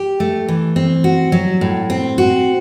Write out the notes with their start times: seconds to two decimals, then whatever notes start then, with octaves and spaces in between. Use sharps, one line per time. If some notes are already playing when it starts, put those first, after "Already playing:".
Already playing: G4
0.20 A3
0.48 E3
0.76 C4
1.04 F#4
1.32 F#3
1.61 A2
1.90 C4
2.18 F#4